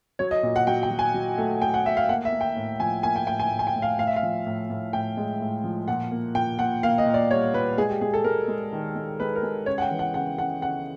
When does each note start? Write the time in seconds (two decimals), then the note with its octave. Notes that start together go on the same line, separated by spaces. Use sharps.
0.19 F#3 C#5
0.31 D#5
0.43 A#2
0.56 F#5
0.67 F#3 G5
0.83 G5
0.90 F#3
0.99 G#5
1.14 F#3
1.38 A3
1.62 A3 G5
1.74 F#5
1.85 A3 E5
1.97 F5
2.09 A#3 F#5
2.25 E5
2.32 A#3
2.41 G5
2.56 A2
2.80 F3 G#5
3.03 A#3 G#5
3.16 G5
3.27 A2 G5
3.40 G#5
3.51 A2
3.59 G#5
3.67 G5
3.75 A2
3.82 F5
3.99 A2 F5
4.07 E5
4.16 F5
4.23 F3
4.46 A2
4.70 A2
4.93 A2 G5
5.17 G#3
5.41 A2
5.64 F3
5.88 A#2 F#5
6.11 A#3
6.35 A#2 G5
6.59 A#2 F#5
6.83 A#3 F5
6.98 D#5
7.06 A#2
7.14 D5
7.30 G3 C#5
7.54 A#2 B4
7.78 G#3 G#4
7.89 G4
8.01 G#3 G#4
8.14 A4
8.24 G#3 A#4
8.48 G#3
8.72 D#3
8.95 G#3
9.20 G#3 B4
9.36 A#4
9.43 G#3
9.66 C#3 C#5
9.78 F#5
9.82 G5
9.91 E3
9.99 F#5
10.14 C#3 F#5
10.38 C#3 F#5
10.62 C#3 F#5